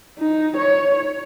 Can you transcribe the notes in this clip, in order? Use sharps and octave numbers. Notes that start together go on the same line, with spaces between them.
D#4
C#5